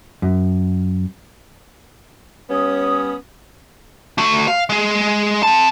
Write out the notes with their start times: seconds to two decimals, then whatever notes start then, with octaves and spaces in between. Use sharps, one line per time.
0.22 F#2
2.50 G3 B3 C#4 D#6
4.18 A3 F#4
4.48 F5
4.70 G#3 G#4
5.43 C4 A5